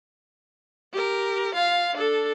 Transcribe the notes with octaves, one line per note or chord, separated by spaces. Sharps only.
G4 A#4
F4 F5
D4 A4